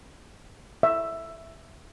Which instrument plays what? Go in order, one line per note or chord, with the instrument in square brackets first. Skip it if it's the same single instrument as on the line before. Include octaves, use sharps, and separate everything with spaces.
[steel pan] E5